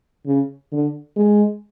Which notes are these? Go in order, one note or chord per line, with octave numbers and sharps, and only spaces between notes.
C#3
D3
G#3